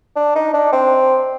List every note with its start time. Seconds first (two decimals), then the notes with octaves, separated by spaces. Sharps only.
0.16 D4
0.36 D#4
0.54 D4
0.73 C4